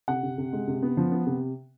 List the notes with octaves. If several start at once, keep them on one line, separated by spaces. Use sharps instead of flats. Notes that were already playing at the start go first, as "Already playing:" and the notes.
C3 F#5
C3
C3
G#3
C3
B3
F3
B3
C3